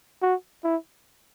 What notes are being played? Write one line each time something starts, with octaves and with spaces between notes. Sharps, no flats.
F#4
E4